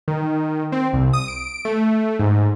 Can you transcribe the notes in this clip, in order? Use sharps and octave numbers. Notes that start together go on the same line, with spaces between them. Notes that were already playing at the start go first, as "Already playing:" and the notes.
D#3
C4
C2
D#6
D7
A3
G#2